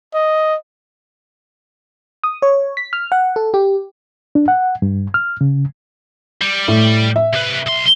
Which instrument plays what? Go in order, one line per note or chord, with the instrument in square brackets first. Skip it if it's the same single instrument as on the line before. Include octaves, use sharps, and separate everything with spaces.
[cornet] D#5
[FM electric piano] D#6
C#5
B6
F6
F#5
A4
G4
[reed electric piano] D4
F#5
G2
F6
C#3
[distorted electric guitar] G3
[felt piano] A2
E5
[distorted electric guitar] C3 B4
B1 C6